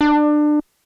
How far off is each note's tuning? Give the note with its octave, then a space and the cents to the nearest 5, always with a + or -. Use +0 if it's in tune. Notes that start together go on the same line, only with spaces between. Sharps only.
D4 +25